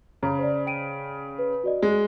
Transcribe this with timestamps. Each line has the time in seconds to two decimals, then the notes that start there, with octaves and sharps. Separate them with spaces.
0.23 C#3 A#5
0.39 C5 D5
0.67 G5 D7 D#7
1.39 B4
1.64 F#4 D5 D#5
1.82 G#3